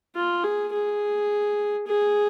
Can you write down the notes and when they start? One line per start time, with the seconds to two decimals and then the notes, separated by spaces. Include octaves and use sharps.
0.15 F4
0.44 G#4
0.73 G#4
1.87 G#4